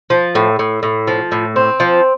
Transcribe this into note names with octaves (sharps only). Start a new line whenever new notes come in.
F3
A2
A2
A2
F3
A2
C4
F3